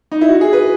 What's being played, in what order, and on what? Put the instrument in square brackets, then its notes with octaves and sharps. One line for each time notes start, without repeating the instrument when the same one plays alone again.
[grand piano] D#4
E4
F#4
G#4
B4